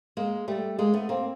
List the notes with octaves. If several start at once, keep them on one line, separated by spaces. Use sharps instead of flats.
G#3 A#3
G3 A3
G#3 A#3
A3 B3
A#3 C4